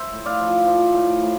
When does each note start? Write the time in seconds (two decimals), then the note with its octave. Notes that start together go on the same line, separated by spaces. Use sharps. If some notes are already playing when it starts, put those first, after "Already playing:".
Already playing: C5 E5
0.12 A2
0.25 D5 F5
0.40 F3
0.67 F3
0.94 A2
1.23 A2